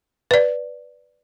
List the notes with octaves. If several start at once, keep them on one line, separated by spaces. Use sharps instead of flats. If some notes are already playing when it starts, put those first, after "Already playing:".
B4 D5